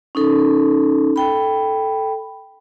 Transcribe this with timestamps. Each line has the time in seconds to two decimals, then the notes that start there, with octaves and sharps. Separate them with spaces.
0.15 C#4 D#4 A4
1.16 A4 G5 B5